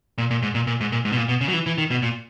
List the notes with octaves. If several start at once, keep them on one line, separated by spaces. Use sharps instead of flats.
A#2
A#2
G#2
A#2
A#2
G#2
A#2
G#2
B2
A#2
B2
C#3
F#3
E3
E3
D#3
B2
A#2